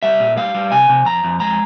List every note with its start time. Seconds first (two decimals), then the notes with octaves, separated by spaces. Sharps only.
0.03 G3 E5
0.20 A#2
0.37 G3 F5
0.55 G3
0.72 C3 G#5
0.89 C3
1.05 F2 A#5
1.24 F2
1.40 G#3 A#5